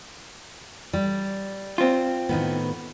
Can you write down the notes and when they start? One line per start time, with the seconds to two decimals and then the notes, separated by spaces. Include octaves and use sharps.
0.93 G3
1.78 C4 F4
2.29 A2 D#3 B3